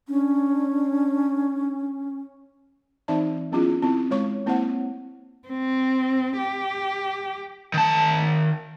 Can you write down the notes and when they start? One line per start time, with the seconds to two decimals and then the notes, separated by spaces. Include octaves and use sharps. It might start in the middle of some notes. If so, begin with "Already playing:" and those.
0.08 C#4 D4
3.08 E3 C4 D#4 D5 E5 A5
3.52 F#3 B3 C#4 E4 F4 G#4
3.82 C4 E4
4.11 G#3 C#5 C#6
4.46 A#3 C4 E4 C5 C#5 F#5
5.48 C4
6.38 G4
7.74 D#3 A5